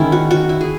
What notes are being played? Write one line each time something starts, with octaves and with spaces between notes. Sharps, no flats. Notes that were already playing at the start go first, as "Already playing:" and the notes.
Already playing: D#3 G#3 C#4 E4
F#4
F#4
E4
G#4